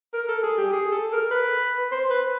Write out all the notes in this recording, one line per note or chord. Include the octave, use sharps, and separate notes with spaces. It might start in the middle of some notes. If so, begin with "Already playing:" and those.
A#4
A4
G#4
G4
G#4
A4
A#4
B4
C5
B4